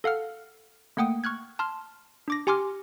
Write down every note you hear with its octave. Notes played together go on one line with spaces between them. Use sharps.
A4 F5 F#5 F6
A3 A#3 F#5 G5 D#6
C#6 F6 F#6 G#6
A5 C6 F6
D4 D6 A#6
G4 G#5 C6 D6 F6